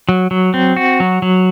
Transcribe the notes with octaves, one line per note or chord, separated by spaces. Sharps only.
F#3
F#3
C4
F#4
F#3
F#3